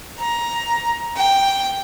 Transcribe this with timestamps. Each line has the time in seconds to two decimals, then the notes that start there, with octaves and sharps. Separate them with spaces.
0.19 A#5
1.17 G5